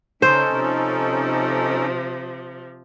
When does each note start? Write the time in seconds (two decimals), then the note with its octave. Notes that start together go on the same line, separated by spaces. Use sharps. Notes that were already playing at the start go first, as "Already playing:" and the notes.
0.22 C#3 C#4 D#4 A4 C5
0.54 C3 F3